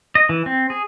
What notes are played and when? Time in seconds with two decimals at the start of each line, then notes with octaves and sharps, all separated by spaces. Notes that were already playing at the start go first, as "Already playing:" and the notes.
0.15 D#5
0.29 E3
0.46 C4
0.70 G#4